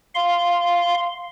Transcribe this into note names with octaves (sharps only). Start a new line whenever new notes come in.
F5 C6